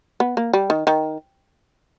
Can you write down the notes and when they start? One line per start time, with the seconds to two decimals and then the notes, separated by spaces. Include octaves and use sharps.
0.20 B3
0.37 A#3
0.53 G3
0.70 D#3
0.87 D#3